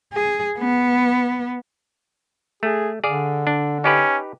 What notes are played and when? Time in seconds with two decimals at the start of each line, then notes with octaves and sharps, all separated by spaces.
0.13 G#4
0.59 B3
2.63 A3 G#4
3.04 D3 G#4 D5 F5
3.47 D4
3.84 C#4 D#4 G4 B4